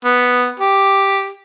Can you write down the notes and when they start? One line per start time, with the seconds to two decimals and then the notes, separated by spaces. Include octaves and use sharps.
0.05 B3
0.60 G4